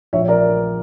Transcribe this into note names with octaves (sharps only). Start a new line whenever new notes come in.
A#1 C#5 E5
A#4 D5